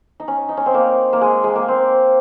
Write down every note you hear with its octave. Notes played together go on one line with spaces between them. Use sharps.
D#4
C#4
D#4
C#4
C4
A#3
A#3
G#3
G#3
A#3
C4